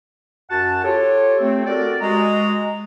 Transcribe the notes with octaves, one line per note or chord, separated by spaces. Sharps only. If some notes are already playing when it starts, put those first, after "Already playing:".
F#2 F#4 F#5 A5
F4 G4 A4 C#5
A3 C4
F#4 G4 A4 A#4 D5
G#3 F#4 A#5